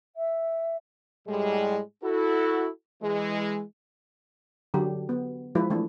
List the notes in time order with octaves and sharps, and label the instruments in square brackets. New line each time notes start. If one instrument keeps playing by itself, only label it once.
[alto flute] E5
[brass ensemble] A2 G3 G#3
E4 F#4 A4
E3 G#3
[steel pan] D3 F#3 G4
B3
F3 G#3 E4 B4
E3 A3 D4